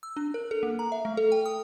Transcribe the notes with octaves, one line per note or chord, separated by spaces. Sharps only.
E6
D4
A#4
A4
A#3
A#5
E5
A3
A4
G5
D#6